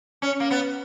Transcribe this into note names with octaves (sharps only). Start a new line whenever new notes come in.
C#4
A#3
B3